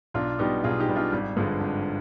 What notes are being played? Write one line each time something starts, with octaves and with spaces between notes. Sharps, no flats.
B1 D4 F4
B2 G3 D#4 G4
B1 F4 G#4
D#4 G4
B2 G3
D4 F4
G#1 G3
G2 D3 F3 G#3
G#1